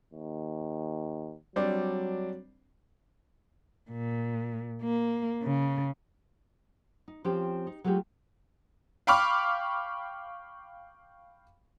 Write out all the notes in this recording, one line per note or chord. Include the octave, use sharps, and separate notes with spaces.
D#2
F#3 G3 C4 D4
A#2
A#3
C#3
D#4
F3 C4 C#4 F4 G4
D#4
F#3 G#3 A3 F4 G4
F5 G5 B5 C#6 D6 F6